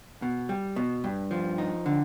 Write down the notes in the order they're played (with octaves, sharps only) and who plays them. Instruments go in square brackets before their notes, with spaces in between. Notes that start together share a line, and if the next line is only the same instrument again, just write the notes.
[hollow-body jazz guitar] B2
G3
B2
G2
F3
D#4
D3